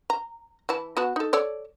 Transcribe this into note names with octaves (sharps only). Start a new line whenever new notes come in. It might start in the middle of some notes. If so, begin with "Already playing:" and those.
A#5
E3 E4 A5
B3 F#4 A5
D#4 A4
A4 C#5 D5